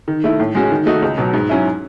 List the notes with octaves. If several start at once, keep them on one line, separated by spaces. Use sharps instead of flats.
D#3
A3 E4
A2
G#3 C#4 F#4
D#3
A3 D#4 F#4
C#2
B2 F#3
G#2
F#3 C#4 E4